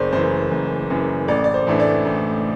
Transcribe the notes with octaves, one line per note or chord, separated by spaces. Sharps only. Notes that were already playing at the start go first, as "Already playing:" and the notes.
Already playing: F#1 C5 D5
F#2 E3 C5
F#1
F#2 E3
A1 D5
D5
C5
A2 E3 A3 D4
D5
A1